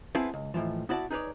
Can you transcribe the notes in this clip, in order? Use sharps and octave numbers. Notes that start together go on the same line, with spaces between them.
B3 C4 E4 G#4 F5 A5
C#2
D#2 A2 D3 E3 F3
B3 E4 F#4 D5 A5
D#4 G#4 B4 C#5 D5